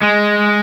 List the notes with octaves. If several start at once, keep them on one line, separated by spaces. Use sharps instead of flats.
G#3